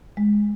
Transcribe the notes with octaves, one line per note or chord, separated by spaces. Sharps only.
G#3